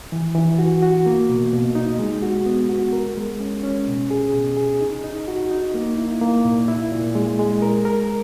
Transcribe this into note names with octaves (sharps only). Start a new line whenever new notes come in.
E3
E3
F#4
F#4
A#3
B2
B2
D#4
G#3
F#4
B3
F#4
A#4
G#3
C#4
C#4
B2
G#4
B2
G#4
D#4
D#4
F#4
D#4
A#3
E4
A#3
A#2
E4
A#2
G#3
G#3
A#4
A#4